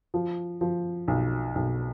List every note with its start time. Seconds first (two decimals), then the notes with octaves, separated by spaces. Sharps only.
0.14 F3
0.61 F3
1.08 B1
1.55 B1